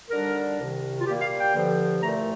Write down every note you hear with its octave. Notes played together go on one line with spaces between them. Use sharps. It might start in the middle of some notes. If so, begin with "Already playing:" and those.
D#2 D3 G3 D4 A#4
C2 C3 D#3
F4
A#2 G3 A#3 G4
F5
G5
G2 D3 F3
C2 A#2 A3 A#5